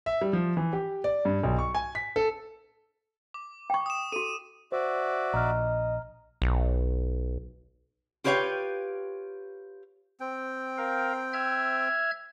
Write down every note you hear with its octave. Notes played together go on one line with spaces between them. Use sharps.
E5
G3
F3
E3
G4
D5
G2
B1
C#6
G#5
B6
A4
D6
G5 C#6
D#6 E7
F#4 A4 D#7
F#4 C5 D5 E5
A#1 D#5 A#5 F6
B1
F4 G4 B4 C#5 F5 G5
C4 G5
A#4 F5
E5 F6 G#6